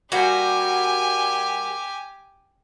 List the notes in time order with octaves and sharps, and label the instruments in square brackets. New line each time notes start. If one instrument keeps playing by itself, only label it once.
[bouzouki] G3 A#3 F#4 [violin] G4 G#5